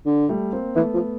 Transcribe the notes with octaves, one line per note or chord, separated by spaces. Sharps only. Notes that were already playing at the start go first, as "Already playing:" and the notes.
D3
G3 A3
A#3 C4
E3 A3 B3
F3